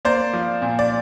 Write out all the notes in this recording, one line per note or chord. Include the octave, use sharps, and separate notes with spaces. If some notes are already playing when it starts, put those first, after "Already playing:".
A#3 C5 D5
F3
A#2
D5